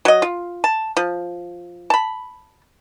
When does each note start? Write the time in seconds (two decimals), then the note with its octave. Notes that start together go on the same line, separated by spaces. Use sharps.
0.05 F#3 D#5
0.22 F4
0.64 A5
0.97 F3
1.90 A5 B5